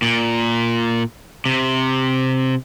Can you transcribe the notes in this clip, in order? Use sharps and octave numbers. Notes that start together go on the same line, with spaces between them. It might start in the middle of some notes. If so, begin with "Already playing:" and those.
A#2
C3